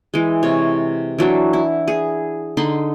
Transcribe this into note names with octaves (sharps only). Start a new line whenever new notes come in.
E3 G#3
C3 C#5
E3 F#3 D4
E4
G#4
D3 D#4 B5 C6